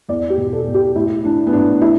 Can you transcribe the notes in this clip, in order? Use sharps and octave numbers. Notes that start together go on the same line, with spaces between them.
E2 D5
G4
B2
A4
B2
G4
A2 E4
E3 D4
B3
A2 D4
E3 E4